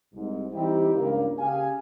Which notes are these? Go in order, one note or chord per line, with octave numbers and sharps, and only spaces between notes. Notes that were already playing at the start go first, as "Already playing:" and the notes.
C2 G#2
E3 G3 C4 D#4 E4 G4
C#2 G2 A#3
C#3 G4 G#4 F5 G#5